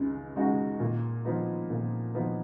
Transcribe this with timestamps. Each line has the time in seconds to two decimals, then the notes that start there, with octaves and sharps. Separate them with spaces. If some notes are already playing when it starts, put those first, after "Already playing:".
Already playing: C#2 G#3 D#4
0.35 C#3 G#3 D#4 F#4
0.80 A#2
1.25 F3 B3 D#4
1.70 A#2
2.14 F3 B3 D#4